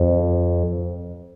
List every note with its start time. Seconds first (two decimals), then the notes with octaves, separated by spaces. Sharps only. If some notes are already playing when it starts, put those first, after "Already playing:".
Already playing: F2